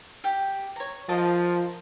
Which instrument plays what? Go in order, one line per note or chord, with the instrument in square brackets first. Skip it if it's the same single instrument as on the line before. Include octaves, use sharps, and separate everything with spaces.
[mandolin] G4
C#5 A#5
[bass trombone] F3 [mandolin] A#4 D#5 A5